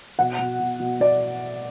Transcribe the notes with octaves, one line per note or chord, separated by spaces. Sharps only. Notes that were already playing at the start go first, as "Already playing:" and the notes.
B2 F#5
B2
B2
B2
B2 D5